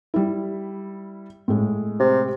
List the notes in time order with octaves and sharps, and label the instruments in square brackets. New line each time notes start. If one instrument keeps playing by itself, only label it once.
[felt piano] G3 E4
A2 G#3
[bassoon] C3